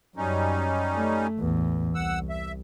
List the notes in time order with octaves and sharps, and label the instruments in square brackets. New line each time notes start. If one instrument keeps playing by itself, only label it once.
[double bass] F#2 [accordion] G3 C#4 D#4
[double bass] A3
A1 E2
[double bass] C2 [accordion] F#5 E6
[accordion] E5